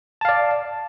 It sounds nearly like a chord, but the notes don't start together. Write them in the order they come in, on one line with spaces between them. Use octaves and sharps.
A5 F5 D5